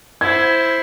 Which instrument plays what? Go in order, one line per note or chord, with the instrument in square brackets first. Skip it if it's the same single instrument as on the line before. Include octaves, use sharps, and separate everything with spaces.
[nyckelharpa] E4 C5 [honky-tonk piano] G#6